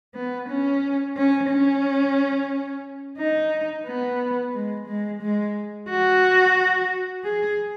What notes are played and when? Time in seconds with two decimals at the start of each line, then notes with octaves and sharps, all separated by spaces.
0.14 B3
0.49 C#4
1.17 C#4
1.50 C#4
3.18 D#4
3.86 B3
4.54 G#3
4.87 G#3
5.22 G#3
5.89 F#4
7.24 G#4